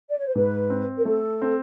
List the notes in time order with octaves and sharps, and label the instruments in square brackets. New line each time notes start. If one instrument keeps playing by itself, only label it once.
[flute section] D5
C#5
C5
[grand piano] G#2 [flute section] B4
[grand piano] C4
[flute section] A#4
[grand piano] A3 [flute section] A4
[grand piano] C4